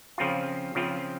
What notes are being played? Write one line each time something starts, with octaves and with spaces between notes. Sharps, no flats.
C#3 F3 C4 F4
C#3 F3 C4 F4